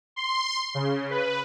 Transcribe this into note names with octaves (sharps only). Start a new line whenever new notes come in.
C6
C#3
B4